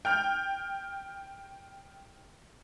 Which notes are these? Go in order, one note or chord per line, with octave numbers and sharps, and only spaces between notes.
G5 F6 G6